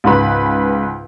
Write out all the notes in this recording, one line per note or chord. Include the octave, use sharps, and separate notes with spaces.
C#2 G#2 B4 B5